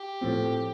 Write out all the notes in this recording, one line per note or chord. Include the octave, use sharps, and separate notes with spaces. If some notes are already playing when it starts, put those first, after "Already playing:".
Already playing: G4
A2 F3 C4